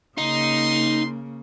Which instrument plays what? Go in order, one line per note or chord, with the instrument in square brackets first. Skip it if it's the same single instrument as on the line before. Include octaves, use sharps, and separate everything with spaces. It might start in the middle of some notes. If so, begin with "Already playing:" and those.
[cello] C#3 A#3 [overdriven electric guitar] D#4 [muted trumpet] C6